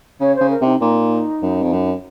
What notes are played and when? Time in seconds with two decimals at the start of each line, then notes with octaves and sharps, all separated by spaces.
0.20 C#3 C#5
0.36 C#3 C5
0.50 A#4
0.61 C3 D#4
0.81 A#2 D#4
1.42 F#2
1.62 F2
1.72 F#2